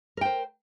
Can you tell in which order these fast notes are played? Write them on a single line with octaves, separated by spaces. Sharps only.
A#4 G5 C5